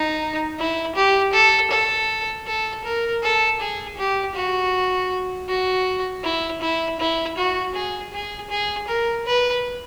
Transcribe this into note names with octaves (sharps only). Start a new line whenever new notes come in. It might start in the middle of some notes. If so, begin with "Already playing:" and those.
Already playing: D#4
E4
G4
A4
A4
A4
A#4
A4
G#4
G4
F#4
F#4
E4
E4
E4
F#4
G#4
G#4
G#4
A#4
B4